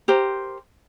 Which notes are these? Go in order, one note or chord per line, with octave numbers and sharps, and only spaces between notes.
G4 A#4 C5